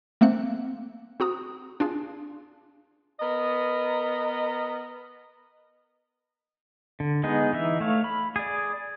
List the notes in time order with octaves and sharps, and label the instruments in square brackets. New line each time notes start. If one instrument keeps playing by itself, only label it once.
[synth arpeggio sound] A3 A#3 C4 F#5 F#6
C4 F#4 A#5 D#6
D4 F4 G#4
[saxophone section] B3 A#4 D#5
[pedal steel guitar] D3
G#3 B3 D#4 G#4
E3 D#4 E5
A3 C#5 F5
B5
G#4 D5